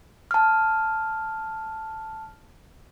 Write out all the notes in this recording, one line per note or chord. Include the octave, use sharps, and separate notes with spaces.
A5 F6